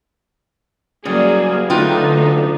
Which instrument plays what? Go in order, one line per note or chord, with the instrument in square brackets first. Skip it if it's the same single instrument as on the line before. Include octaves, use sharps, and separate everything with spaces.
[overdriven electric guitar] C#3 F#3 [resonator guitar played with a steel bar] G3 [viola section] A#3 G#4
[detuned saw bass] D3 [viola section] A3 D4 D#4 [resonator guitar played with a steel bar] F4 B4 G5